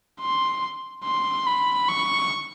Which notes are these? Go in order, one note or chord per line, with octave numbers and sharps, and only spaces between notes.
C6
C6
B5
C#6